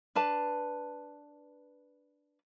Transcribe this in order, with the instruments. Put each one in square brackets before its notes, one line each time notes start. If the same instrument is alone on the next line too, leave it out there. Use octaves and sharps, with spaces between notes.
[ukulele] D4 B4 A5